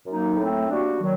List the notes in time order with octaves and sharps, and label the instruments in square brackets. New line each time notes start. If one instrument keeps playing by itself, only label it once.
[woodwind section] F#2 F#3 A#3 D#4
A2 A3 C4
G3 A#3 D4 F#4
D#3 F#3